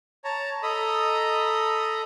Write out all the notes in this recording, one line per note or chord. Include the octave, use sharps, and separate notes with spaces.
C#5 A5 A#5
A4 D#5 A#5 B5 D#6